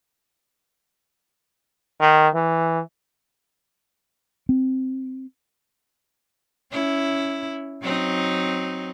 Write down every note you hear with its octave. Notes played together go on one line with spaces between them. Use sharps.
D#3
E3
C4
C#4 E4
F#3 C4 D#4